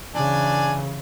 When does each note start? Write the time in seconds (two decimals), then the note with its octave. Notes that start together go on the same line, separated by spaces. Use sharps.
0.15 C#3 E3 D4 G#5